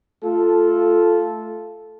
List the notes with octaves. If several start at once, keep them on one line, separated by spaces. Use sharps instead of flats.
A3 F4 A4